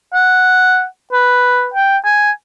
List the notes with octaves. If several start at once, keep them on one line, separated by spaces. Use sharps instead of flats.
F#5
B4
G5
G#5